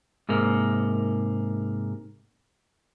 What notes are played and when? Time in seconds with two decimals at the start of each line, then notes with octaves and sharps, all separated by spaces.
0.29 G#2 C3 A#3